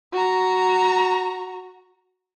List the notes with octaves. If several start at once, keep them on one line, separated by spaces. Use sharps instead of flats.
F#4 A#5